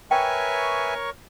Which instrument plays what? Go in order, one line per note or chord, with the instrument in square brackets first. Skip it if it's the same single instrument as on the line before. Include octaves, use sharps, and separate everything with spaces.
[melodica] A#4 C#5 C#6 [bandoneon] B4 E5 G#5 [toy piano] G5